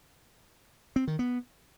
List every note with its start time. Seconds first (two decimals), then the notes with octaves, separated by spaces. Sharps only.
0.96 C4
1.07 D#3
1.19 B3